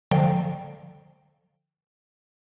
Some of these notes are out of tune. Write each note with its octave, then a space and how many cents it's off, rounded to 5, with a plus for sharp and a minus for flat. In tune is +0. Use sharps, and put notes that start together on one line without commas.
D3 +10 F3 +0 G5 +0